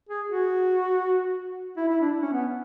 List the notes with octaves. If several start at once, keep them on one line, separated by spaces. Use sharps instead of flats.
G#4
F#4
E4
E4
D4
C#4
B3